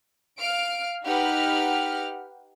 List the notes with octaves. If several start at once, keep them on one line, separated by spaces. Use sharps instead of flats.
F5 F6 D7
D#4 G4 B4 F#5 F6